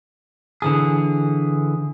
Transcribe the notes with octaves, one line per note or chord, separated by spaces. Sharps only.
D3 E3 G#4